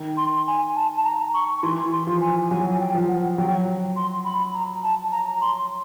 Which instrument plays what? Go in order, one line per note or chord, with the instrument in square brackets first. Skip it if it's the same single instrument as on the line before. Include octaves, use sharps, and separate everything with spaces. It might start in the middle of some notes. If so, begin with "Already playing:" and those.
Already playing: [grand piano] D#3
[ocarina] C6
G#5
A5
A5
A#5
C#6
[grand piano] E3 [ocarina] C6
[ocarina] C6
[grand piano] F3
[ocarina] G#5
[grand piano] F#3 [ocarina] G#5
[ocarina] G5
[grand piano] F3
[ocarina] F#5
[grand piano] F#3 [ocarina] G5
[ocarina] C6
B5
A#5
A5
A#5
C6